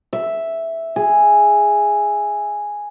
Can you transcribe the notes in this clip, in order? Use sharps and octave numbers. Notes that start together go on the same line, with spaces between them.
E5
G#4